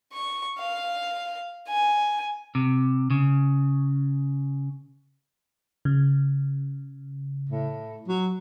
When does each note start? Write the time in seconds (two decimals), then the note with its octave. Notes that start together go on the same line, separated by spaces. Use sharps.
0.13 C#6
0.59 F5
1.69 G#5
2.55 C3
3.10 C#3
5.85 C#3
7.50 A2
8.08 F#3